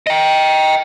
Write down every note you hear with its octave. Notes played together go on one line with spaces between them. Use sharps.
D#5 G5